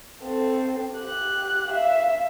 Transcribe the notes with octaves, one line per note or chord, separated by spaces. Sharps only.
C4 A4
G4 F#6
E5 F5